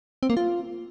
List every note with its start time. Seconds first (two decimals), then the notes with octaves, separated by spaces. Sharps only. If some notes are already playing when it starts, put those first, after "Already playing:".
0.23 C4
0.30 A#3
0.37 F4